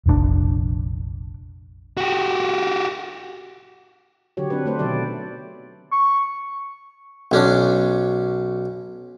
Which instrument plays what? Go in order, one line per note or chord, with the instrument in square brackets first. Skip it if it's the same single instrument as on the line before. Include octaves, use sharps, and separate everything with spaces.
[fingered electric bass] F1 A#1 C3 D4
[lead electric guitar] F#4 G4
[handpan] D3 F#3 F#4 G4 C#5
C4 D4 G4 B4
A3 B4 C5
B2 D#3 F#3 A4 D5
[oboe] C#6
[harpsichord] B1 C#4 D4